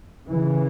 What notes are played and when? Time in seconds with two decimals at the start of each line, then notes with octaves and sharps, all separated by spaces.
0.27 C#3 E3